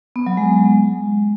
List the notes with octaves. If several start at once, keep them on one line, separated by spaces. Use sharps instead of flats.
B3
F#3
G#3